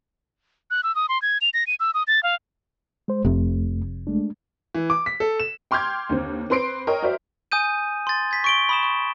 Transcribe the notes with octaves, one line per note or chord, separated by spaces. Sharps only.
F#6
E6
D#6
C6
G#6
F7
A#6
D#7
E6
D#6
A6
F5
G#3 C5
F1 F2 C3 A3
G#3 A3 D4
E3
D6
B6
A4
E7
G5 C6 D6 F6 G6 G#6
D#2 D3 C4
C4 B4 C6 C7 D7
A#4 C#5 D#5 G5
F#4 A#4 C5 D5 E5
G#5 D#6 G6 D#7
C6 A6
G#6 B6
C#6 D7 G7
B5 D#6 E7
C#6